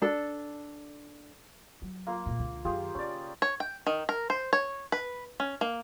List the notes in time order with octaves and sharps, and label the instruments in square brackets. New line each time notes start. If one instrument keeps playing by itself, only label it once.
[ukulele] D4 A4
[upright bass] F#3
[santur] A#3 F4 A#4
[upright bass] C#2 A#2
C#2 D3
[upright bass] F#2 D#3 [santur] F4 G4 G#4
[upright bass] C#3 [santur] C#4 D5
[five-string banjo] C#5
G5
D#3
A#4
C5
C#5
B4
C#4
A#3